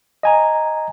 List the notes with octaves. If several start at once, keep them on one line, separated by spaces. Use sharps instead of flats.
D#5 G#5 A#5